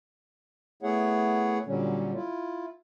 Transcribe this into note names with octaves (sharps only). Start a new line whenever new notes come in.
A3 B3 E4 G#4 C#5 F#5
A#2 D3 F#3 G3 C#4
E4 F4